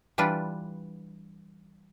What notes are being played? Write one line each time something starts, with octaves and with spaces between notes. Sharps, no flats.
E3 G3 D4 F4 B4